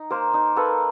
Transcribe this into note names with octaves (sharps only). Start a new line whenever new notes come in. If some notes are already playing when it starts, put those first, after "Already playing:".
Already playing: D#4
A#3 A#4 C5
D#4
A#3 A4 B4